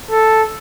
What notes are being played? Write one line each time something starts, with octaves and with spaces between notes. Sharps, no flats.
A4